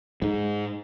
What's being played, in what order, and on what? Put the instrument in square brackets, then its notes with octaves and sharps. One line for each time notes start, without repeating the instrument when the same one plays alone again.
[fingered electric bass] G#2